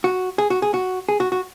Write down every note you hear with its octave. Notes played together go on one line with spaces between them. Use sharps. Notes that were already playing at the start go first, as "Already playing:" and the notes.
F#4
G#4
F#4
G#4
F#4
G#4
F#4
F#4